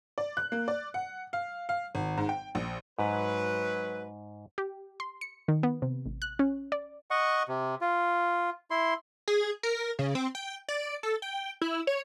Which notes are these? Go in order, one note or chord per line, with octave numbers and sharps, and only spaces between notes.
D5
F#6
A#3
D5
F#5
F5
F5
G#1
G#2
G5
A#1
G#2 F#3 B4
G4
C6
C#7
D#3
B3
C3
A1
F#6
C#4
D5
D#5 F#5 C#6
C3
F4
E4 C6
G#4
A#4
C#3
C4
G5
D5
A4
G5
E4
C#5